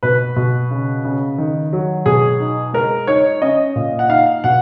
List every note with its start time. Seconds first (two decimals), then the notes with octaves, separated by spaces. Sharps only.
0.03 B2 B4
0.36 B2
0.71 C#3
1.04 C#3
1.38 D#3
1.73 F#3
2.06 B2 G#4
2.40 D#4
2.74 G#3 A#4
3.07 D#4 C#5
3.42 C#4 D#5
3.76 A#2
3.99 F#5
4.09 D#4 F5
4.44 B2 F#5